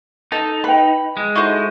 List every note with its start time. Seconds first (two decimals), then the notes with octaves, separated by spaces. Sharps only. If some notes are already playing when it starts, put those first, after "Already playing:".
0.32 D#4 A4 D#5 A5
0.64 B4 G5 B5
1.17 G#3
1.36 D#4 E4 F#4 A4 C5 D#5